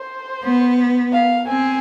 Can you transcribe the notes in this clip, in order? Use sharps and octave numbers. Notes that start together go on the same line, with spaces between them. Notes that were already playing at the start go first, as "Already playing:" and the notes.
Already playing: C5
B3
F5
C4 G#5